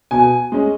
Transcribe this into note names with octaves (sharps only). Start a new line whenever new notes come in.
B2 G#5
G#3 C#4